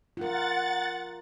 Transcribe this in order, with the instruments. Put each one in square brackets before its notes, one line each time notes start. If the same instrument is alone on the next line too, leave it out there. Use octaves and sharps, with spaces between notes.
[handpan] F4 A#4 [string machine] F#5 A6